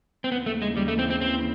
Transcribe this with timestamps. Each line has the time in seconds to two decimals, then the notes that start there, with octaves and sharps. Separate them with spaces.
0.24 C4
0.32 D#2 C#3 E3 B3
0.46 A3
0.62 G#3
0.77 G3
0.88 A3
0.99 C4
1.10 C4
1.21 C4